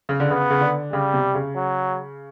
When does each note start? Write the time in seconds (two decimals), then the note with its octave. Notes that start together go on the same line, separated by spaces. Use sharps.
0.09 C#3
0.20 D3
0.29 C#3 B3
0.50 C#3
0.61 D3
0.93 C#3 G3
1.14 C3
1.35 C#3
1.55 F#3